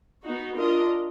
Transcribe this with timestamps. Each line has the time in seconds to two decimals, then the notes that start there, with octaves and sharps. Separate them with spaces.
0.24 B3 D#4 F#4
0.56 D4 F4 A#4 D#5